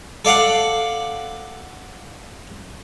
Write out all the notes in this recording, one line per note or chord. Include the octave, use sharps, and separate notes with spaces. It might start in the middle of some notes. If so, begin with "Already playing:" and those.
A4 D5 F5 F#5